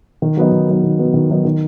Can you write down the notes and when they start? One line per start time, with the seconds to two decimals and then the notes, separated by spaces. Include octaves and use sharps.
0.22 D#3
0.37 F#3 B3 D#4
0.52 D#3
0.68 F#3 B3 D#4
0.83 D#3
0.99 F#3 B3 D#4
1.14 D#3
1.30 F#3 B3 D#4
1.45 D#3